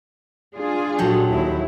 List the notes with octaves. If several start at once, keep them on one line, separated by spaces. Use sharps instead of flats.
D4 F4 G#4
A#1 F#3 G4 A4
D#2 E4